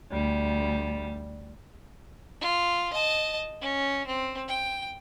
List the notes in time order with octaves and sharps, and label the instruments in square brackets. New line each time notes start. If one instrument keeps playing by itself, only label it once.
[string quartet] D2 G3
[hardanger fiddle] F4
D#5 A5
C#4
C4
G5